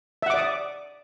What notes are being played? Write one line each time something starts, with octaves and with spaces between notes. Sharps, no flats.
D5 E5 F#5 D6 D#6